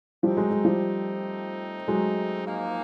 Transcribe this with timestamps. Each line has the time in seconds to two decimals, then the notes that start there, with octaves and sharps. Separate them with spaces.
0.23 F3 G3 A3 C4 D#4
0.37 F#3 G#3
0.51 F#3 G#3
0.65 F3 G3
1.88 F#3 G#3
2.44 G#2 F3 A#3 D#4